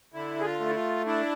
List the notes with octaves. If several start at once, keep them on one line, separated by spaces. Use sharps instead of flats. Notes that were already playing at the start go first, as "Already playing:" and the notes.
D3 E4
G#4
F4
A3
E4
F4
D4 E4